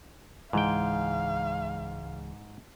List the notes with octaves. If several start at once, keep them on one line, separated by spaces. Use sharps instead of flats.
C#2 G#2 E3 G#3 F5 G5